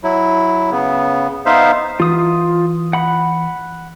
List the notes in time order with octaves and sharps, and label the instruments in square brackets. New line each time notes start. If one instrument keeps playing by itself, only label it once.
[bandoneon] F#3 E4
C#3 B3
B3 D#4 C5 E5 F5
[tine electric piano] E3 [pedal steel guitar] F4 D#6
[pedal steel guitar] F#5 B5